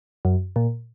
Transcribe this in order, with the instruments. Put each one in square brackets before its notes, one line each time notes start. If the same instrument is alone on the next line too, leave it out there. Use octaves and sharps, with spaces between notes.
[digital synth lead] F#2
A#2